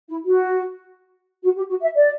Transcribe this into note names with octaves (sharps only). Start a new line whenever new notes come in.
E4
F#4
F#4
G4
F#4
E5
D5